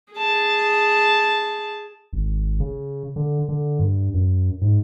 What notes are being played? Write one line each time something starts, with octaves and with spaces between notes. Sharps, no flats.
G#4 A5
G#1
C#3
D3
D3
G2
F#2
G#2